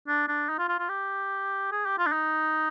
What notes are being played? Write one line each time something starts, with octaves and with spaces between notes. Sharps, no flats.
D4
D4
D#4
F4
F4
F4
G4
G#4
G4
F4
D4
D#4